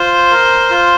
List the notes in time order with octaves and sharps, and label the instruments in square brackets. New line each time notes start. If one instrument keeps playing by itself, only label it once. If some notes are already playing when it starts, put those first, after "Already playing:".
Already playing: [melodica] F4 [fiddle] C5
[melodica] A#4
F4